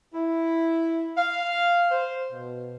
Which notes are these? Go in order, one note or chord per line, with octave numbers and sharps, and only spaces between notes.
E4
F5
C5
B2